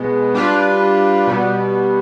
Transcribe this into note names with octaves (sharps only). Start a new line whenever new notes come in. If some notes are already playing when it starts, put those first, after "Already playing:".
Already playing: B2 G#3 B3
G3 D4 F4 B4
B2 G3 B3